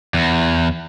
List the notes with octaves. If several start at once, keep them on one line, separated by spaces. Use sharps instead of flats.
E2